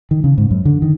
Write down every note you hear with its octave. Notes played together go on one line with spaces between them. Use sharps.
D#3
C#3
G#2
F#2
D3
D#3